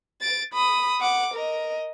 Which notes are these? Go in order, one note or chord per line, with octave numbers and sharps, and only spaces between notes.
A6 D7
B5 D#6
F#5 D6
A#4 D#5